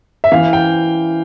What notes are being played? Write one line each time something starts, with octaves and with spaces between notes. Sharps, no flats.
E5
E3 F5
G5